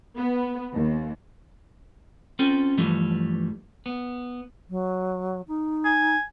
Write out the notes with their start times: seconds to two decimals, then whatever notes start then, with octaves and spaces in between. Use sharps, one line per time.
0.16 B3
0.74 D#2
2.39 C4 C#4 F4 A4 G5
2.78 G2 E3 F3 G3 A3
3.86 B3
4.70 F#3
5.48 D#4
5.85 G#5